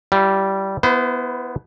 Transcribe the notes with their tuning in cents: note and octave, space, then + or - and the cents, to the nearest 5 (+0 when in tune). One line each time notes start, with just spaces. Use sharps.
G3 -15 E4 +35
B3 +0 E4 +5 C5 -35